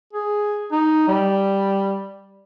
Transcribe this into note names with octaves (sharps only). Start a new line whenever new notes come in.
G#4
D#4
G3